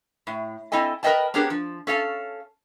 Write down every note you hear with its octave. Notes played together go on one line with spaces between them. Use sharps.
A2
C4 E4 A4 D#5 G#5
A#4 B4 C#5 D#5 G5 A5
B3 C#4 D4 G4 G#4 A#4
F3
C#4 A4 F5 G5 A5